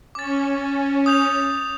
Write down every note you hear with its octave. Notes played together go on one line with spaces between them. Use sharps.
C#4 D6 A6
D#6 G6 F7